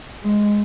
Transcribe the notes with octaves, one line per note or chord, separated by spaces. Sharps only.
G#3